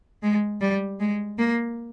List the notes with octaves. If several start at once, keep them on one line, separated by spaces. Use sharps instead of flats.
G#3
G3
G#3
A#3